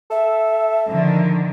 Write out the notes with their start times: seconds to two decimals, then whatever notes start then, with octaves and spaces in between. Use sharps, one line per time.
0.11 A4 E5
0.88 D3 D#3 F3